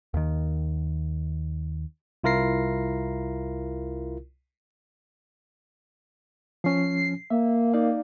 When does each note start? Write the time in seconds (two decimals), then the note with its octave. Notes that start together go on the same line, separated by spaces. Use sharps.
0.14 D#2 D#3
2.24 C2 E4 F4 A#4 A#6 C7
6.64 F3 C#4 C7
7.30 A#3 E5
7.73 D#4 D5 F5